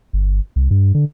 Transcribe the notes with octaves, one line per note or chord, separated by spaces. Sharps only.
G1
C2
G2
D3